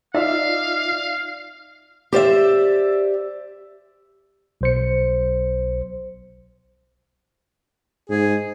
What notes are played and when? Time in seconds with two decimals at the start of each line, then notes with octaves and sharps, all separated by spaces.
0.15 D#4 F4 D5 E5 F5
2.12 G4 C5 D5 E5
4.61 B1 C5 C#7
8.10 G#2 G#4